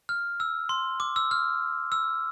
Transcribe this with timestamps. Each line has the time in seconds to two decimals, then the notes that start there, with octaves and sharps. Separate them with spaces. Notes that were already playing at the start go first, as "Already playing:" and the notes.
0.09 F6
0.40 E6
0.69 C6
1.00 D6
1.16 E6
1.31 F6
1.92 E6